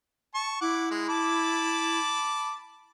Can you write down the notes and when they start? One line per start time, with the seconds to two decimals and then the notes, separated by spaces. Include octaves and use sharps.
0.35 A5 C#6
0.61 E4 F#5 D6
0.91 G#3
1.09 A5 B5 D6